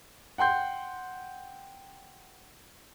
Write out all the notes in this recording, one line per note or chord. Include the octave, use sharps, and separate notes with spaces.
F#5 G5 C6 G6